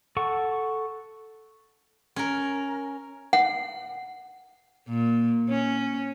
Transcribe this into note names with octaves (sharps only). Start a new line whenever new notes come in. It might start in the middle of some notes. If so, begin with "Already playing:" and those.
A4 F#5 C#6
C#4 A#4
F#5
A#2
C#4